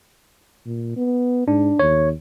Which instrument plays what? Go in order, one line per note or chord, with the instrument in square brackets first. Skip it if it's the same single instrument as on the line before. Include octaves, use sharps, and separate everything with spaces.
[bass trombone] A#2
B3
[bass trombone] G#2 [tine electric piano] D4
[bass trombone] D#2 [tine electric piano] C#5